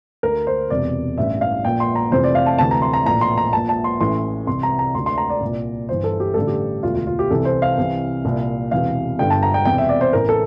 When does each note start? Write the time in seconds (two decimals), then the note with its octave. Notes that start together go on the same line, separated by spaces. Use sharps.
0.23 D2 D3 A#4
0.47 C5
0.70 E1 E2 C3 D5
1.18 A1 G2 E3 E5
1.41 F5
1.64 A#1 A#2 G5
1.80 C6
1.96 A#5
2.11 F1 F2 C3 E3 C5
2.24 D5
2.35 F5
2.46 A5
2.59 D2 C3 E3 A5
2.71 A#5
2.82 C6
2.93 A#5
3.05 A#1 A2 E3 A#5
3.21 C6
3.38 A#5
3.53 A#1 A#2 A5
3.69 A5
3.84 C6
4.00 A1 A2 E3 C6
4.47 C2 C3 E3 C6
4.63 A#5
4.79 A#5
4.94 D2 C6
4.99 D3
5.06 C6
5.18 A#5
5.30 D5
5.41 C2 A#2
5.89 G1 G2 E3 C5
6.04 A4
6.20 G4
6.34 A1 G2 D3 A4
6.47 G4
6.83 E1 D2 D3 F4
6.94 F4
7.07 F4
7.19 G4
7.31 C2 C3 E3 A4
7.45 C5
7.62 F5
7.78 C2 C3 E3
8.25 C2 A#2
8.71 E1 E2 C3 E3 F5
9.19 G1 G2 D3 G5
9.30 A5
9.43 A#5
9.54 G5
9.65 E1 E2 C3 G5
9.78 E5
9.89 D5
10.01 C5
10.13 A1 A2 E3 A#4
10.29 A4